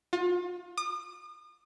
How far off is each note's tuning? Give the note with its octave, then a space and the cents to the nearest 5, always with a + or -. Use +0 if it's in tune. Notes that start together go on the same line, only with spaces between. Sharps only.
F4 +35
D#6 -40